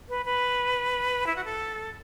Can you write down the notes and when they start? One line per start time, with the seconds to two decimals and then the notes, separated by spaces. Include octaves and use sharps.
0.09 B4
0.25 B4
1.26 E4
1.36 F#4
1.44 A4